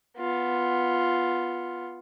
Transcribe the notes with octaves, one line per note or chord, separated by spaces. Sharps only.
B3 F4